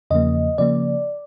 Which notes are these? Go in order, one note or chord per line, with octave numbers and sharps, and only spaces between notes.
E2 C#3 F3 A#3 D#5
C#3 F3 A#3 D5